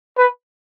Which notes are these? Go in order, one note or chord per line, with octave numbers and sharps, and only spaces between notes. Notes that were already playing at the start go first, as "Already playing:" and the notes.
B4